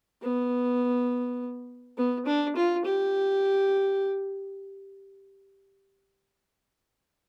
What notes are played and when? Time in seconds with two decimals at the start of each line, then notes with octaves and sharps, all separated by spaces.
0.22 B3
1.97 B3
2.26 D4
2.56 F4
2.84 G4